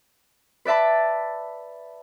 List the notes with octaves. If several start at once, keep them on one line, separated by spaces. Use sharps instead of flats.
B4 D5 E5 A5 B5